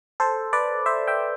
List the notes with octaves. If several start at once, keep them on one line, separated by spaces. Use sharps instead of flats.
A4 C5
B4 D5
C5 E5
E5 G5